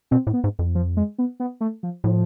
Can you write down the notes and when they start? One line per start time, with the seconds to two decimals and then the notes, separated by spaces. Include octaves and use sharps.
0.11 B2 C4
0.27 A2
0.33 B3
0.44 G#2
0.59 F2
0.75 F3
0.97 G#3
1.18 B3
1.40 B3
1.61 A3
1.83 F3
2.04 A2 F3